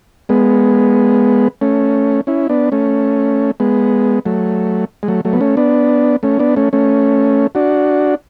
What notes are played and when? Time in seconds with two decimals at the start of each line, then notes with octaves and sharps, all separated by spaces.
0.29 G#3 B3
1.61 A3 C#4
2.27 C#4 E4
2.49 B3 D4
2.72 A3 C#4
3.60 G#3 B3
4.25 F#3 A3
5.03 G#3
5.08 F#3 A3
5.25 F#3 A3
5.33 B3
5.41 A3 C#4
5.57 B3 D4
6.23 A3 C#4
6.39 B3 D4
6.56 A3 C#4
6.73 A3 C#4
7.55 D4 F#4